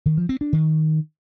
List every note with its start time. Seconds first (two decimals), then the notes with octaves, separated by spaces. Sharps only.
0.06 D#3
0.17 F3
0.29 C4
0.41 D4
0.53 D#3